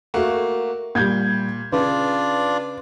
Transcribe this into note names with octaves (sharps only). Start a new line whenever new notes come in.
A3 A#3 F#4
A#2 G3 G6 G#6
C#3 D4 F4 B4 D5